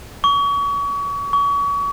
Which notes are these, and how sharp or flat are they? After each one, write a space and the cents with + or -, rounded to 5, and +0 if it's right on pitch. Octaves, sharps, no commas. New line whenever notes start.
C#6 +35
C#6 +35